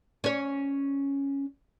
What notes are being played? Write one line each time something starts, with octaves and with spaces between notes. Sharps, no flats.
C#4 C#5